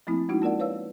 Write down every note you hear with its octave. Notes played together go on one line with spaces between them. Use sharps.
F3 A3 A#3 C4 E4
G#3 C#4 D#4 E4 F#4
A#3 F4 A#4 D5 F#5
B4 C#5 F5 E6